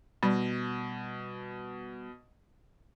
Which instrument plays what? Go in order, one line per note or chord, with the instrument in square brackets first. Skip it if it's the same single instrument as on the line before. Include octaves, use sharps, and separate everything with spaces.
[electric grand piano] B2 [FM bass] G3